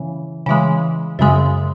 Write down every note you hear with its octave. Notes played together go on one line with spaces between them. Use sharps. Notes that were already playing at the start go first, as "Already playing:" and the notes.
Already playing: C#3 E3
C#3 E3 G#3
F#2 C#3 G#3